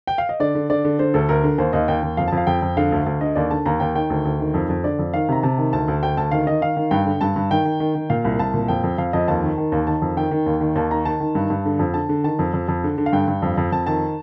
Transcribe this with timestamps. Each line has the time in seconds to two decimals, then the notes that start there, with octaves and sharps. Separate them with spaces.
0.07 G5
0.18 F5
0.29 D#5
0.40 D3 D5
0.55 D3
0.70 D3 D5
0.85 D3
0.99 D3 C5
1.14 D2 A4
1.29 D2 A#4
1.44 D3
1.58 D#2 C5
1.73 D#2 D#5
1.88 D#2 G5
2.03 D#2
2.17 F2 F5
2.28 F2 A5
2.37 F5
2.47 F2 G5
2.62 F2
2.77 D3 F5
2.92 D2
3.06 D2 F5
3.21 D3 D#5
3.35 D#2 D5
3.51 D3 A5
3.66 D#2 A#5
3.80 D#2 G5
3.95 D#3 G5
4.10 D2
4.25 D2
4.40 D#3
4.54 F2
4.69 F2
4.84 D3 D5
4.99 F2
5.14 D#3 F5
5.29 C3 A#5
5.43 C3 A5
5.58 D#3
5.73 D2 A5
5.88 D2
6.03 D2 G5
6.17 D2 A5
6.31 D#3 F5
6.47 D#3 D#5
6.61 D#3 F5
6.77 D#3
6.91 G2 G5
7.06 D3
7.21 G2 A5
7.36 G2
7.50 D#3 G5
7.65 D#3
7.80 D#3
7.95 D#3
8.10 A#2 F5
8.25 C2
8.39 C2 A5
8.54 A#2
8.68 F2 G5
8.84 F2
8.98 F2 F5
9.13 F2 D#5
9.28 D#2 A5
9.43 D#3
9.58 D#3
9.72 D#2
9.87 D#3 A5
10.02 F2
10.17 D#3 G5
10.31 D#3
10.46 D#2
10.61 D#3
10.75 D#2 A5
10.91 D#3 A#5
11.05 D#3 A5
11.20 D#3
11.35 G2
11.50 G2
11.65 D3
11.79 F2
11.94 D3 A5
12.09 D3
12.24 D#3 A5
12.39 F2
12.53 F2
12.68 F2
12.84 D3
12.98 D3
13.06 F5
13.13 G2 G5
13.28 G2
13.42 F2
13.57 F2
13.72 F2 A5
13.86 D#3 A5